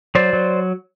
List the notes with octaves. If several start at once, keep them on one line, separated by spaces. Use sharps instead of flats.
F#3 C5 D5
F#3